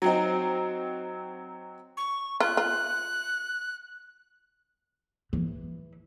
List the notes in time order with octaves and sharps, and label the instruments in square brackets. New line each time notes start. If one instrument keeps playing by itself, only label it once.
[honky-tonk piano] F#3 C4 D#4
[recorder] C#6
[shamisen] F4 [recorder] F#6
[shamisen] F4
[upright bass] E3